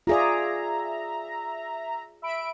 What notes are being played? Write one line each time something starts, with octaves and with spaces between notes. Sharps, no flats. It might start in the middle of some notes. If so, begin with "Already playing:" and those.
F4 G#4 D5 E5 A#5
E5 B5 D7